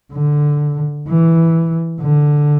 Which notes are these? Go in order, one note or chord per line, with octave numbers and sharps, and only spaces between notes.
D3
E3
D3